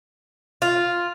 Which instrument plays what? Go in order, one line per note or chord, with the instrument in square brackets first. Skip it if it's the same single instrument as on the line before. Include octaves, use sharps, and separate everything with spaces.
[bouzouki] F4